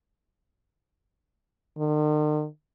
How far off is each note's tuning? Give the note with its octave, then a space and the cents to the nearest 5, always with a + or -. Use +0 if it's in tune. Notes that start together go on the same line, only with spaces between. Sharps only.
D#3 -45